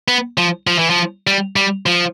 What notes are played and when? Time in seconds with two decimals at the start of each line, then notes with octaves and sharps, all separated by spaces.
0.08 B3
0.38 F3
0.67 F3
0.79 E3
0.90 F3
1.27 G3
1.56 G3
1.86 F3